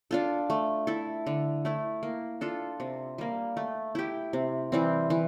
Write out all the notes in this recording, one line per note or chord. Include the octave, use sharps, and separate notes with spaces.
D4 F4 A4
A3
E4 A4
D3
A3 E4
A#3
D4 F4 A4
C3
G3 A#3
A3
E4 G4
C3
E3 G3 C4
E3